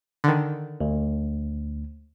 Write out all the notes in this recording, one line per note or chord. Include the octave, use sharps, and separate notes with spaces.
D3 D#3
D2